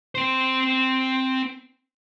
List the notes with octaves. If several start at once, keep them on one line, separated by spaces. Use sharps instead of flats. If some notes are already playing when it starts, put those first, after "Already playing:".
C4 C5